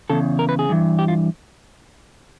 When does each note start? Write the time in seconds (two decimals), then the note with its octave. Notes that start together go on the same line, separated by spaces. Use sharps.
0.10 E2 C#3 A4
0.39 A#4
0.49 B4
0.59 G#4
0.69 G2 E3
0.99 G4
1.08 F4